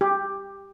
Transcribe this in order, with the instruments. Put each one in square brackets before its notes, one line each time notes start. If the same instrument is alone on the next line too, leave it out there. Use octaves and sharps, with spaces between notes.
[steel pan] G4